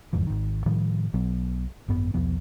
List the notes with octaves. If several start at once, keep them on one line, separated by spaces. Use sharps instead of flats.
F#1 E2 G#2 F3
G#1 D#3
A2 D#3 F3 G3
B1 B2 F#3 B3
G#1 F#2 B3
B1 E2 F3 B3